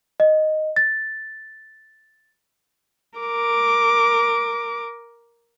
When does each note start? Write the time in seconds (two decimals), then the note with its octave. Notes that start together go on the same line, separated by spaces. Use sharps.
0.20 D#5
0.76 A6
3.18 A#4 D6